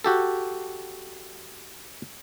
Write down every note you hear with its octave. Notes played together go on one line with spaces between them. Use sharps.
F#4 G4 A4